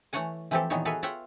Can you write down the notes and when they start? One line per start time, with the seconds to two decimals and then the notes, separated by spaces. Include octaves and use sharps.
0.13 E3 A3 C#5 F#5 G#5
0.51 E3 F3 C4 E4 G4 A4
0.70 A#2 D#3 E3 B3 D#4 C#5
0.85 F#4 G#4 A4 B4 C#5 E5
1.03 F4 C#5 E5 F#5 G5